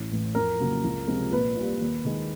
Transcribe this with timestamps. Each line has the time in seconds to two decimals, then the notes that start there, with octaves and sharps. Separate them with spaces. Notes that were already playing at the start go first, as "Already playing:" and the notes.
Already playing: A1
0.11 A2 E3
0.35 F2 A#4
0.60 C#3 F#3 A#3
0.84 C#2
1.08 C3 F3 G#3
1.32 A#1 B4
1.57 A#2 G3
1.81 D#2
2.05 D#3 G#3